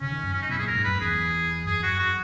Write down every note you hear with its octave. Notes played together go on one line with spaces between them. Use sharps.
C#3 C#4
D#3
F#2
C#4
D#4
B2 E4
G#4
A#2
A#4
G#2
F#2 B4
E2 G#4
F#2 G#4
E2 F#4
F#2
F#4